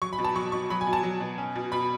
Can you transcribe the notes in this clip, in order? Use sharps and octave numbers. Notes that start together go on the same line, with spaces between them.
F#3 C#6
B5
B2
A5
F#3 C#6
B2 C#6
F#3 B5
G#5
B2
A5
F#3
B2
C#4
B2
B2 B5